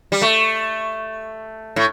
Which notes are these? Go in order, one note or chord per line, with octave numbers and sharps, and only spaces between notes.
G3
A3
A2